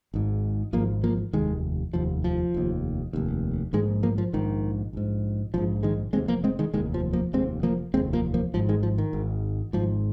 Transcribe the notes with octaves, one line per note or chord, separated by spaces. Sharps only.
G#1 G#2
G#1 G#2 F3 A#3
F3 A#3
F1 D#2 D#3 G#3
F1 D#2 F3
F3
F1 D#2
F1 D#2
A#1 G#2 D#3 G#3
F3 A#3
F3
A#1 G#2 D#3
A#1 G#2
A#1 G#2 F3
D#3 G#3
F1 D#2 G#3 C4
F3 A#3
G#3 C4
D#3 G#3
F1 D#2 D#3 G#3
F3
F3 A#3
F1 D#2 G#3 C4
F3 A#3
F1 D#2 G#3 C4
F3 A#3
F3 A#3
G#1 G#2 F3
D#3 G#3
F3
D#3
G#1 G#2
G#1 G#2 F3